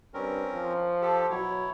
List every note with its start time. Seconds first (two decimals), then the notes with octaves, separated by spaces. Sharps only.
0.14 G2 C4 C#4 A#4
0.53 F3
1.02 G4 A4
1.31 B2 F#3 E4 C#5